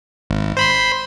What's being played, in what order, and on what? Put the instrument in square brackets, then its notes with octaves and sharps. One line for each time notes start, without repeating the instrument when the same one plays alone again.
[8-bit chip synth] G#1
C5 B5 C6